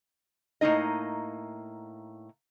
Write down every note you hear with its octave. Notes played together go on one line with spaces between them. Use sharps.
A2 F#3 A#3 D#4 D#5